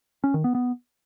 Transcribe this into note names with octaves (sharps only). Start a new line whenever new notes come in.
C#4
D#3
B3
B3